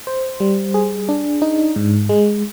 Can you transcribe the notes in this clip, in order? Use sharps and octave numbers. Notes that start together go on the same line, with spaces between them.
C5
G3
G#4
D4
D#4
G#2
G#3